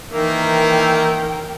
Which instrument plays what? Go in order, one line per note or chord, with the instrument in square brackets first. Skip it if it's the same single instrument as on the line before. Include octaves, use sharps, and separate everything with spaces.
[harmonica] D#3 A#3 E5 [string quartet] E3 [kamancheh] A#4 G5